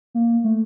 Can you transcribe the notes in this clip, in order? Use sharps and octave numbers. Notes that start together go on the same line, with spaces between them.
A#3
A3